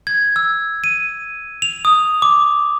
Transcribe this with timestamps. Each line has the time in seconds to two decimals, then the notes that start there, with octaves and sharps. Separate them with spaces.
0.07 G#6
0.36 E6
0.84 D#7
1.62 F7
1.85 D#6
2.22 D6